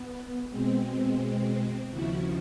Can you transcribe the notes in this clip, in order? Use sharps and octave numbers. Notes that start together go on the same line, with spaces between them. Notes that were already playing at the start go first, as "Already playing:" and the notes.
Already playing: B3
B2 G#3 C4
D#2 C#3 F3 E4 F#4